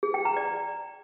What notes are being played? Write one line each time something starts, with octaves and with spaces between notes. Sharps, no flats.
G#4
G5
A#5
D5